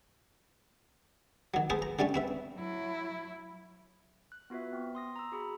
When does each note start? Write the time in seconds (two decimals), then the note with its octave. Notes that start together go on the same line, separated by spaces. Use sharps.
1.54 D#3 F#3
1.70 G#4 A4 B4 C5
1.82 A#5
1.99 D3 G3 A3 C#4
2.14 C4 B4 E5
2.55 F#3 E4
4.32 F#6
4.50 B3 F4 F#4 B4 E5
4.73 B3 C4
4.95 C6 D#6 A#6
5.16 A#5 E6
5.32 F#4 G#4 A#5 B5